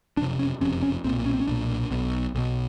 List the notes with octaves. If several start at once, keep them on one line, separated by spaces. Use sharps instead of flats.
F#1 F2 C3 D4
C#4
F#1 F2 C3 C#4
C#4
B1 A#2 C4
C#4
C4
C#4
B1 A#2 D4
B1 B2
B1 B2